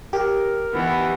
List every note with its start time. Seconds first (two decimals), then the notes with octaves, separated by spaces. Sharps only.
0.13 G4 A#4
0.74 D#3 E3 B3